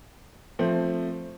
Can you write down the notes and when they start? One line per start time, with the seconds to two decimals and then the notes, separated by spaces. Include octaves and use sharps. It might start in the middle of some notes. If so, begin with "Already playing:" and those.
0.59 F3 A3 C4